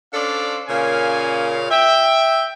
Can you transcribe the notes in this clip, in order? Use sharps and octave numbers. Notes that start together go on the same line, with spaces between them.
C#4 D4 A4 C5 D5 F5
A#2 C#3 A#3 C#4 F5 G#5
E5 G5